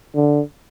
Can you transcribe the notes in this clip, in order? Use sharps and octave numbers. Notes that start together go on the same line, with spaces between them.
D3